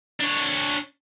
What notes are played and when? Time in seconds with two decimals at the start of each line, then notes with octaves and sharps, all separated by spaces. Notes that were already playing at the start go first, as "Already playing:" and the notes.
0.20 D4 C#5